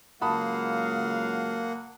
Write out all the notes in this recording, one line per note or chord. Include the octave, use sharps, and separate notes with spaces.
C#2 F#3 A#3 F5 F#5 A5 B5 D#6